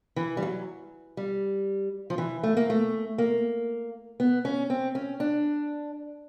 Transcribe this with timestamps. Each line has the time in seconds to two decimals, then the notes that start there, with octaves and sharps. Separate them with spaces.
0.16 E3
0.37 G3
0.43 F#3
1.17 G3
2.10 F3
2.18 E3
2.43 A3
2.57 A#3
2.70 A3
3.18 A#3
4.20 B3
4.45 C#4
4.70 C4
4.95 C#4
5.20 D4